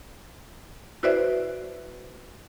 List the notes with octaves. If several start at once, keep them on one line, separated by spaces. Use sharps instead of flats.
E4 F#4 B4 C5 D5 E5